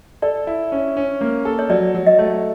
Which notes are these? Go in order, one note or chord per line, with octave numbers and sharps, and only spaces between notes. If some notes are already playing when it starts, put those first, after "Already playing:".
A4 D5
E4
C#4
C#4
A#3
A4
C#5
F#3 D5
F#3
D#5
A3